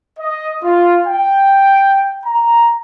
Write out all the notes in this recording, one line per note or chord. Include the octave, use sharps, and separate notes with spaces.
D#5
F4
G5
A#5